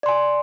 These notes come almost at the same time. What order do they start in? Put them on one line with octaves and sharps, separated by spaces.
D5 C6 G#5